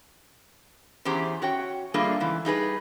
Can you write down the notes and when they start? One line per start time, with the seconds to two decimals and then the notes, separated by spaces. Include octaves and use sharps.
1.05 E2 C#4 G4 G#4 C5 A#5
1.42 C#4 F#4 C#5 G5
1.94 G3 A3 A#3 D4 F4 G#4
2.20 G#2 C#3 E3
2.45 G3 D#4 G#4 B4